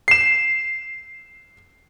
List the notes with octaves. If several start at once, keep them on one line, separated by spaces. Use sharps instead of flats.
C7 E7